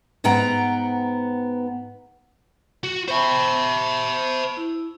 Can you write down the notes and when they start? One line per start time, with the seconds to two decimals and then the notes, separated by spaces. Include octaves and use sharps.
0.24 G#2 B3 F#5 G5 A#5
2.84 F#4
3.08 C5 E5 A5 B5 C#6
4.57 E4